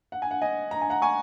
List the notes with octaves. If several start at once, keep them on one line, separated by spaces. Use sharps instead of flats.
F#5
G#5
F#5
D#5 G#5
A#5
G#5
F#5 A#5
G#5 C#6